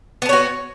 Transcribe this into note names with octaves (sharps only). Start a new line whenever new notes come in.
B3 F#4 A4 C#5